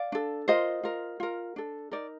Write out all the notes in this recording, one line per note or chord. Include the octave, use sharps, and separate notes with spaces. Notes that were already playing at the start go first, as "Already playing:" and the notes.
Already playing: D5 F5
D4 A4
F4 A#4 C5 D#5
F4 A#4
F4 A#4
D4 A4
D#4 A#4 D5